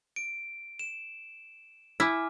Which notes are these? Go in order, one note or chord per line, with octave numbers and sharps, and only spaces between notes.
D7
E7
E4 G#5 D6 F6